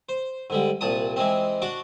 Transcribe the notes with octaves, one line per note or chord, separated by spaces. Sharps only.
C5
G#2 D3 G3
C2 A#2 A5 D#6
E3 G#3 C4
D4 F#4 D6